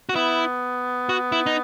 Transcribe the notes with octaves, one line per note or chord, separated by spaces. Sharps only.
F#4
B3 E4
F#4
E4
D#4